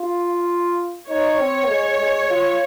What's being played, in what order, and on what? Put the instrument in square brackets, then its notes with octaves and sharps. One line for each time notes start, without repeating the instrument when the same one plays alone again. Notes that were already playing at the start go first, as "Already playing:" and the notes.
Already playing: [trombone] F4
[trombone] D#4 [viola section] C#5
[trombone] C4
G#3
G#3
F4